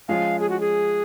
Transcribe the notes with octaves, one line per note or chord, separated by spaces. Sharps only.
F3 G#3 C#4 F4 F5
G#4
F#4
G#4